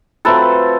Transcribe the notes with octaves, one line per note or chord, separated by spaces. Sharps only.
F#3 A3 C4 F4 A4 B4